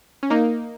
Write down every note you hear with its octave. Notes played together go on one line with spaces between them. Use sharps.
C#4
A#3 D#4